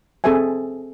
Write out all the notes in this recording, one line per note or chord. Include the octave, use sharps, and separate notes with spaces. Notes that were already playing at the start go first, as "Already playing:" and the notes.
C4 G#4 A4 C5 E5 G#5